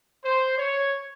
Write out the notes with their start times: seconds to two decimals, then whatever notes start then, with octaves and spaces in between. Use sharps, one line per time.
0.24 C5
0.57 C#5